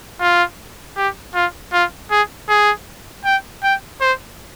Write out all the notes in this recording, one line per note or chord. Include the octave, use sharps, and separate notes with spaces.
F4
G4
F4
F4
G#4
G#4
G5
G5
C5